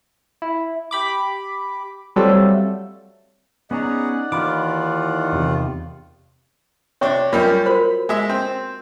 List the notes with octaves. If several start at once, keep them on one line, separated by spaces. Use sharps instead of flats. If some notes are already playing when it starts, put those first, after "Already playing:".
E4
G4 B5 D6
F#3 G3 A3 C4 F4 A4
B3 C#4 D#4 G#4 D5 F#5 A#5
D#2 D#3 E3 F4 B5 D6 F6
E2 C3
C3 D4 C#5 G5 C#6
F#2 G3 F4 A#4 D#5
F#4 A#4 C5 B5
G#3 E5
C4